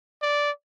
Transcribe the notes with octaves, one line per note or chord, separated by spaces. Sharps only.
D5